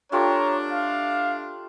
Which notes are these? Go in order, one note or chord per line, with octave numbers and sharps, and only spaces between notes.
A3 D4 F4 G4 C#5 A#5
F5